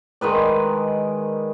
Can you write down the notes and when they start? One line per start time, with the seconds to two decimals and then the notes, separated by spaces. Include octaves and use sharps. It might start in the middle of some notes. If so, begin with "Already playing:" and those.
0.21 D#3 G#3 B4 D5